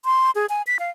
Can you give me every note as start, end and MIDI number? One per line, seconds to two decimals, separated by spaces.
0.05 0.31 84
0.35 0.46 68
0.49 0.62 80
0.67 0.77 95
0.79 0.90 77